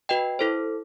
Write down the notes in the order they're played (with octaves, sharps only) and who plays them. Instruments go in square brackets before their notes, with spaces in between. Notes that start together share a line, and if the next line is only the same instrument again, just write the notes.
[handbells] F#4 B4 D#5 G5
E4 A4 C5